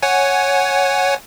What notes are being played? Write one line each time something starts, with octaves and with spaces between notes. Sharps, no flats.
C#5 F#5 G#5